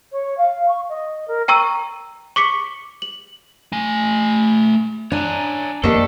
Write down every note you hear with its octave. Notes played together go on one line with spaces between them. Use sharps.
C#5
F5
C#6
D#5
A#4
G5 A#5 C#6 E6 D#7
C#6 D6 B6 C#7
F#7
A3 G#5
D4 C#5 G#5 A#5
F2 D#3 G3 A#3 D4 A4